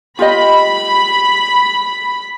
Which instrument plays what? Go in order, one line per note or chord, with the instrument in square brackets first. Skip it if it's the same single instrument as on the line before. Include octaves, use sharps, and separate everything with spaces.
[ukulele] F4 G4 D#5 [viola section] B5